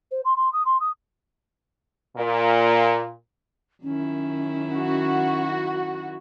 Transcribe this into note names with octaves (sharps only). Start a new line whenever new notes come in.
C5
C6
C6
D#6
C6
D#6
A#2
F#2 D#3 C#4 E4
F#4